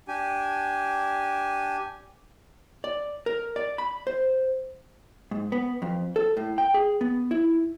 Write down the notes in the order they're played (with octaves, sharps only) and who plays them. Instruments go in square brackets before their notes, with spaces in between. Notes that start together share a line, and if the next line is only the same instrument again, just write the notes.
[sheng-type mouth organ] D4 G4 G#5
[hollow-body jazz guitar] D5
A#4
D5
B5
C5
G#2
B3
F2
A4
A2
G5
G#4
B3
E4